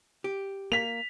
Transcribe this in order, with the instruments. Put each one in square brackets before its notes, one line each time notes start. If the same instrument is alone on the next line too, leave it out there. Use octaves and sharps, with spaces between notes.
[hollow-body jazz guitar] G4
[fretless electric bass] A#3 [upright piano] B6 F7